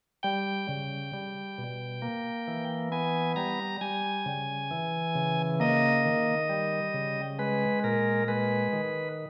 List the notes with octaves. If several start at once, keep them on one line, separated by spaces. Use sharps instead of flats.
G3 G5
C#3
G3
B2
A#3
E3
B3 G#5
G3 A#5
G3 G#5
C#3
E3
C#3
A#3 D#5
D#3
G3
C#3
G#3 B4
A#2 A#4
G#3 B4
D#3